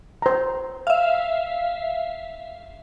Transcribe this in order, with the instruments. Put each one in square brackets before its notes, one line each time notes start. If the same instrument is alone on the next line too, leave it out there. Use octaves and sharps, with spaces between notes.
[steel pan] C5 A#5
[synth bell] E5 F5